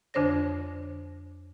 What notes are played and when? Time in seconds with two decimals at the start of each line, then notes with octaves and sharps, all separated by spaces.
0.14 F2 D3 D4 C5 C#5 A#6